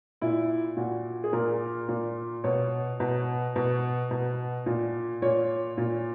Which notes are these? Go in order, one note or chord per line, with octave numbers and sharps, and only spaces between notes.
A#2 E4
A#2 F#4
G#4
A#2 A#4
A#2
B2 C#5
B2
B2
B2
A#2
A#2 C#5
A#2